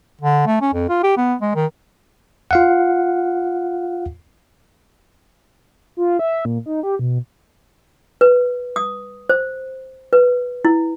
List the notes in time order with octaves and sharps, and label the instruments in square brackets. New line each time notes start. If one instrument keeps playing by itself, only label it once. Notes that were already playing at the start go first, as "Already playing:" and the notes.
[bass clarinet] D3
A3
C#4
F2
F4
G4
B3
G#3
D#3
[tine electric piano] F4 F5 F#5
[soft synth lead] F4
E5
A#2
D#4
G4
B2
[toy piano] B4
D#6
C5
B4
E4